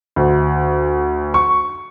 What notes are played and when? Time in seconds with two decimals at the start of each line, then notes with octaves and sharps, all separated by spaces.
0.16 D2
1.34 C#6